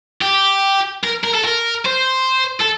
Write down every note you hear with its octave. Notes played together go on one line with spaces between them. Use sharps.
G4
A#4
A#4
A4
A#4
C5
A4